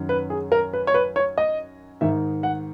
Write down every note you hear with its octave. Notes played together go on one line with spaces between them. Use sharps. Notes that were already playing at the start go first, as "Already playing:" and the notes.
Already playing: F#2 D#3
B4
G#4
A#4
B4
C#5
B4
C#5
D#5
G#2 D#3 E5
F#5